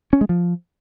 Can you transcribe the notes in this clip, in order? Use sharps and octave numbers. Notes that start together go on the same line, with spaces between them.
C#4
G#3
F3